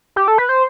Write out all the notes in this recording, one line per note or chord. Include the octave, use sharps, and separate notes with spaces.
G4
A4
B4
C5